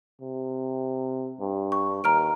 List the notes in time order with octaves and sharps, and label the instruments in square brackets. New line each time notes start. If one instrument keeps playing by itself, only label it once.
[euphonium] C3
G2
[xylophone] C#6
[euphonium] D#2 [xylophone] A#5 F6 D7